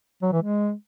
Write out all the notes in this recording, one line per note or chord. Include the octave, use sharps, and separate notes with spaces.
F#3
E3
G#3